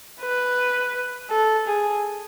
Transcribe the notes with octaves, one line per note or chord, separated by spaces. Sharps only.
B4
A4
G#4